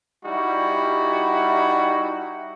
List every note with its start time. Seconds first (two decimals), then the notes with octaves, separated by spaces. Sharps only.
0.25 G3 D#4 E4 F#4